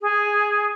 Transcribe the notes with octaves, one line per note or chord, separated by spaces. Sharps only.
G#4